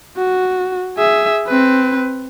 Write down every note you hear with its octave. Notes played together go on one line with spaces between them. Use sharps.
F#4
G#4 E5
C4 B4